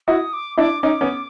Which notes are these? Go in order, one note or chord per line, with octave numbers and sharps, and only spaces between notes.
E4 F#4 D#6
D6
D4 E4 D6
C#4 D#4 D6
B3 C#4